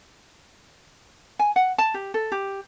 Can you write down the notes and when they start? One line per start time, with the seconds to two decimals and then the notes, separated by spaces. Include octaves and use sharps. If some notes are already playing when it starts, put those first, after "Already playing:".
1.39 G#5
1.56 F#5
1.78 A5
1.94 G4
2.14 A4
2.32 G4